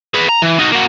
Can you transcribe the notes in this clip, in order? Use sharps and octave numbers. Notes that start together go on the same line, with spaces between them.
G#4 B4
A#5
E3
D#4 F#4
A#3 F#4